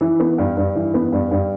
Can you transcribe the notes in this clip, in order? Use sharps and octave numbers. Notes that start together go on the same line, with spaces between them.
E3
B3
G2
G2
E3
B3
G2
G2